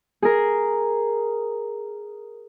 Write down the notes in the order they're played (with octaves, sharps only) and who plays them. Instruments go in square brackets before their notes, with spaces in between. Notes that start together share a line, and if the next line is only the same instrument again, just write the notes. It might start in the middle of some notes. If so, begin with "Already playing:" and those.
[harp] G#4 A#4